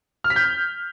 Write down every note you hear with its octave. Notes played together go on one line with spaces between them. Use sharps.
F6
B6
G6